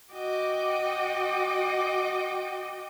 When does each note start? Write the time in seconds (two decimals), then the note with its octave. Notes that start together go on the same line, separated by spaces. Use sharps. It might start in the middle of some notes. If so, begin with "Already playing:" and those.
0.12 F#4 D#5 G5 D6